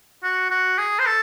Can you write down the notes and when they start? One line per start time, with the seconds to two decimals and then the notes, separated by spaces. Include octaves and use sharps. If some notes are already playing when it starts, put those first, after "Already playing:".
0.23 F#4
0.50 F#4
0.78 G#4
0.99 C5
1.06 A4